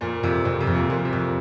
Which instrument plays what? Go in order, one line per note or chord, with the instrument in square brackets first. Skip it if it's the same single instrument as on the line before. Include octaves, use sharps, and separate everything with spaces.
[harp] F2 [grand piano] A#2
[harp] F2 [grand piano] C3
[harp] F2 [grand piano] C3
[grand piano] C3
[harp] F2
[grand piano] A#2
[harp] F2 [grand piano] A#2
[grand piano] C3
[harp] F2